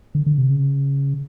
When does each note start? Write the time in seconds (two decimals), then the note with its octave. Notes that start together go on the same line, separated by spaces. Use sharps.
0.15 D3
0.27 D3
0.38 C3
0.50 C#3